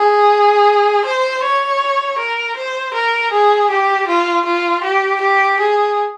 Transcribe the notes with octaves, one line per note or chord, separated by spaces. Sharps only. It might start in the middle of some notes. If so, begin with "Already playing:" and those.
Already playing: G#4
C5
C#5
A#4
C5
A#4
G#4
G4
F4
F4
G4
G4
G#4